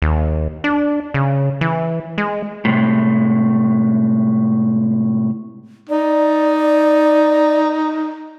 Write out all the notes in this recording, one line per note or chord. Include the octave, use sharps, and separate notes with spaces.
D#2
D4
C#3
E3
G#3
A2 C3 G#3
D#4 D5